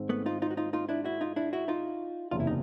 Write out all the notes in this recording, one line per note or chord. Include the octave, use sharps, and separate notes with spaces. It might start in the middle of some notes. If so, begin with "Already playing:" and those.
Already playing: G#2 D#3 G#3 C4
A3 B3
D#4 F4
D#4 F4
F#4
D#4 F4
D#4 F4
D4 E4
E4 F#4
D#4 F4
D4 E4
E4 F#4
D#4 F4
F#1 E2 C3 F4
E4
D#4